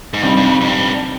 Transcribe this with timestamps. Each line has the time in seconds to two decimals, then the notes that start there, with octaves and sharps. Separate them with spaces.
0.14 G#2
0.22 G2 C3 G3 C4 D#4
0.37 G2
0.44 F2
0.61 F2
0.67 G2